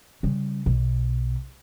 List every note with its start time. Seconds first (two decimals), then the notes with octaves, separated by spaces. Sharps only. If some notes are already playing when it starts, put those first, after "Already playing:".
0.23 C#3 G3
0.66 B1